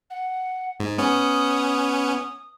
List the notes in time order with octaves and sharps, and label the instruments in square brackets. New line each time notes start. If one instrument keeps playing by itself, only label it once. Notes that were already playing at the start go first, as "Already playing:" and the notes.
[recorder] F#5
[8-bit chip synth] G#2
[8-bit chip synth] B3 C#4 [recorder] D#6